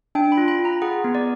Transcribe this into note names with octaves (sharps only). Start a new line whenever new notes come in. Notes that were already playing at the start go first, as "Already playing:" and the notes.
D4 G5
B5
F4
B5
F4
A#5
G#4 F#5
B3
D5